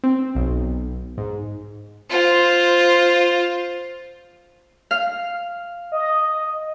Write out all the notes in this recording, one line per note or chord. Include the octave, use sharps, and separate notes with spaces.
C4
B1
G#2
F4 C5
F5
D#5